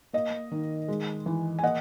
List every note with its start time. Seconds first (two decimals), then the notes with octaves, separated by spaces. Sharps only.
0.13 A#3 D#5
0.51 D#3
0.88 G#3
1.26 E3
1.59 G#5
1.63 A#3 D#5 F#5